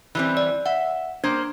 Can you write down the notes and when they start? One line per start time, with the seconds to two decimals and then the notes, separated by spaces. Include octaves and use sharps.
0.15 E3 G3 C4
0.37 D5
0.66 E5 F#5
1.24 A#3 D4 C5